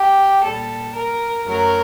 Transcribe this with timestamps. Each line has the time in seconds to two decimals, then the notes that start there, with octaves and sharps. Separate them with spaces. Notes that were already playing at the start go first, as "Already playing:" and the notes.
Already playing: G4
0.42 A#2 G3 A4
0.94 A#4
1.46 F#2 F#3 A3 A#4